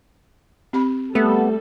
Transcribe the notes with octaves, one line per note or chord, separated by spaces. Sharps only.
C4 G4 B5
G3 A3 B3 A4